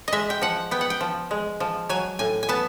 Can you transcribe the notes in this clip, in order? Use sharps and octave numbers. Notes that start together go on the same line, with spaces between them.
G#3 D#5 E5
G5
F3 F#5
B3 G5
F#5
G5
F3
G#3
F3
F#3 G#5
A2 G#5
G#5
B3 A5